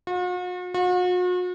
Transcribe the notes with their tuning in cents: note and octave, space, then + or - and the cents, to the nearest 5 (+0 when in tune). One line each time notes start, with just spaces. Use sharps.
F#4 -45
F#4 -40